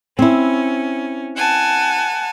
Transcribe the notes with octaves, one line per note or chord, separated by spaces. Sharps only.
C4 C#4 E4
F#5 G#5 A5